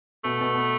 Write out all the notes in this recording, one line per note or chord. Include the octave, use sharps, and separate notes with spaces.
B2 A3
B2
B3